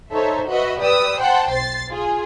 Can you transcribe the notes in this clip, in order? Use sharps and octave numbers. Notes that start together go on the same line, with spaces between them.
D#4 A4 C5 C#5 E5
F#4 B4 D#5 E5 F#5
G4 B4 D5 D#6 E6
C5 F#5 G5 A5 C6
B1 C5 A6 C7
F4 G#4